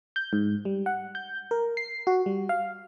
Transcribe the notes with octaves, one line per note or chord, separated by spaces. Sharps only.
G6
G#2
G3
F#5
G6
A#4
C7
F#4
G3
F5